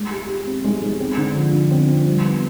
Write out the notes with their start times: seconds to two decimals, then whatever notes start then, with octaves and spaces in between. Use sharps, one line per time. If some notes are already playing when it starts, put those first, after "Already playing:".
Already playing: G#3
0.11 G4
0.29 G4
0.47 C4
0.64 G#3
0.82 G#3
1.00 C4
1.17 D3
1.35 F3
1.53 D3
1.71 C4
1.89 F3
2.06 G3
2.24 B3